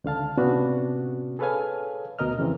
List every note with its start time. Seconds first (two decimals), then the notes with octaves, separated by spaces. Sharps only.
0.04 C#2 D3 F5 A5
0.37 A2 C3 B3 C#4 D4 F#4
1.39 G#4 A4 B4 C#5 F5 G#5
2.19 D2 B2 A#4 D#5 F6
2.38 F2 C#3 E3 C4